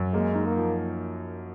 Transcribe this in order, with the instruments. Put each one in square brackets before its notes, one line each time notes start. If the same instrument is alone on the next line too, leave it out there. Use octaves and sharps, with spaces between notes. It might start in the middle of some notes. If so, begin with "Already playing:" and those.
Already playing: [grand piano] F#2
[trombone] G#3 [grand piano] A#3
[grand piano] D#4
[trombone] A#3
[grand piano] F3